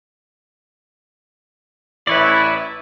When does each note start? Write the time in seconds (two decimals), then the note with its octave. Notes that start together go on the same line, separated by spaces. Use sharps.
2.07 A1 E4 B4 C#5 D5